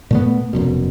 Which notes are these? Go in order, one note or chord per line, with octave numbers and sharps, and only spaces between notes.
A#2 A3 B3
F1 F#2 B2